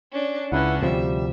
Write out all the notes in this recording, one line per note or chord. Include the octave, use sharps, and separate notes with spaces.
C#4 D4
C#2 C#4 D4 E4 B4 F#5
D2 C3 F3 G3 E5